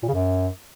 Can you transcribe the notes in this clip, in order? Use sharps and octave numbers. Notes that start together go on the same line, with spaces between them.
A#2
C#3
F#2